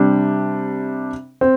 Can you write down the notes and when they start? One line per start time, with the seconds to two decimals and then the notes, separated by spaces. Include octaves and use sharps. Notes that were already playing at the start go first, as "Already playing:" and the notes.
Already playing: C3 G3 D4
1.41 C4